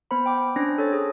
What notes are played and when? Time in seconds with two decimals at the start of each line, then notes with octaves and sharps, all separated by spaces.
0.11 B3 C5 B5
0.26 G5 D6
0.56 C#4 D4 C5 A#6
0.78 A4 C#5 A6
0.93 G#4